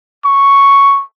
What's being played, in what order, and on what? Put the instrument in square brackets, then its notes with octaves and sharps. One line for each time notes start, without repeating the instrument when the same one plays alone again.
[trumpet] C#6